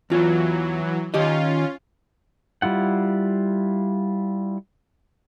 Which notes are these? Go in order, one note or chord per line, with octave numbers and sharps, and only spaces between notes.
E2 E3 F#3 F4
D#3 C#4 F4 G4 D#5
G3 E4 F4 F#5